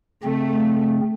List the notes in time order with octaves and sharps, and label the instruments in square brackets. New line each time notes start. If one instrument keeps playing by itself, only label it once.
[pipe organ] C#3 C4 [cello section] A3